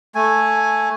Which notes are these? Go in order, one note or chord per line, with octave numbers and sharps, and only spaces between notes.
A3 G#5